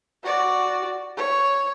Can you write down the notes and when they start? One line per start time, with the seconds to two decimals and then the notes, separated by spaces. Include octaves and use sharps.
0.24 F#4 D5
1.17 C#5